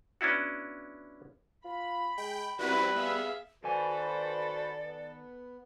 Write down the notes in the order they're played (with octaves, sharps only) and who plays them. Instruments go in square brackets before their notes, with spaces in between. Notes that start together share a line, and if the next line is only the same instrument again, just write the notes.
[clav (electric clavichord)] B3 C#4 D4 E4 F#4
[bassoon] F4 [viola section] B5
[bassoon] G#3 [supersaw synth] G5
[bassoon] G3 [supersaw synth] C4 E4 F#4 [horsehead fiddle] B4
[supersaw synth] B3 [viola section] G#4 E5 F5
[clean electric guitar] D#3 G#5 [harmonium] F#4 B4 C5 [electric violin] A4 [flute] D5
[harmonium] B3